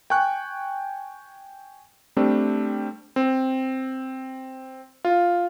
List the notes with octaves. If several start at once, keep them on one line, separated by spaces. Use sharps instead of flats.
G5 G#5 C#6 F#6
G3 A3 C4 D4
C4
F4